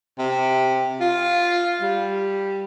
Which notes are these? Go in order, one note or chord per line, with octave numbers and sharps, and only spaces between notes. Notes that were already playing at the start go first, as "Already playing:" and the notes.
C3
F4
G3